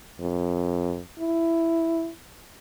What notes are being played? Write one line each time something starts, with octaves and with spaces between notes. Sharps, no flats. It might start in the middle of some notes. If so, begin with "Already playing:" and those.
F2
E4